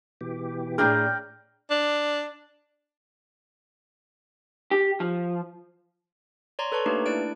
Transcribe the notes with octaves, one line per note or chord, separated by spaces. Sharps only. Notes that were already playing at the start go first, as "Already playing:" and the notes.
B2 E3 G4
A2 D4 G#4 D5 G5 A#5 F6 G6
D4
G4
F3
C#5 D5 A#5 C6
A4 B4 C#5 A5 C#6
A3 A#3 D4 D#4 G4 B4
A3 D4 E4 D5 F#6 D7